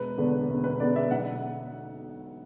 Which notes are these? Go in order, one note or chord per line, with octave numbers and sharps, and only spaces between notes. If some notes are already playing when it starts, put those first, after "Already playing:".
Already playing: E1 B4
E2 D3 B3 D4
E1
B4
E2 D3 B3 D4 D5
E5
B1 F#5